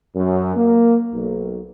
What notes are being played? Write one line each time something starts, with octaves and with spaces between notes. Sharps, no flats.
F#2
A#3
B1